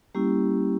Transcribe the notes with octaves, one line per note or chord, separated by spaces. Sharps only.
G3 A#3 C#4 E4 G4